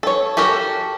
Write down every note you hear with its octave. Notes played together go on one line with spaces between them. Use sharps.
A4 C#5
F#4 G4 A4 A#4